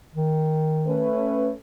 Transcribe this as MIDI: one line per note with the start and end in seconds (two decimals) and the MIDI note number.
0.14 1.11 51
0.87 1.51 57
0.87 1.51 61
0.87 1.51 71